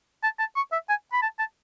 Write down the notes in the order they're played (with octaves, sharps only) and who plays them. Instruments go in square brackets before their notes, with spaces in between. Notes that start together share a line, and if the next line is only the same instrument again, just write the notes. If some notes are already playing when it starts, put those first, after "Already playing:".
[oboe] A5
A5
C#6
E5
G#5
B5
A5
A5